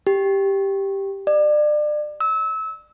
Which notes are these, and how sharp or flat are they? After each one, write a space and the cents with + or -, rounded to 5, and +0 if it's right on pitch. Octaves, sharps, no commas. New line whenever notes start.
G4 +0
D5 +30
E6 -25